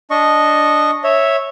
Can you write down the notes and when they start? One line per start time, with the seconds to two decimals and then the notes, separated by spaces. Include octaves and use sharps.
0.10 D4 D#5 C#6
1.04 C#5 E5